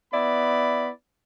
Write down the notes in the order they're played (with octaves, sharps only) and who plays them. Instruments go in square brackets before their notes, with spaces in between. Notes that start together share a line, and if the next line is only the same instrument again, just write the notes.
[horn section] B3 E4 D5 B5